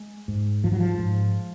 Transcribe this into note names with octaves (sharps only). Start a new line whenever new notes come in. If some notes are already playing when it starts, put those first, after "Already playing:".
Already playing: G#3
G#2
G#2 F3
F#3
F3
G#2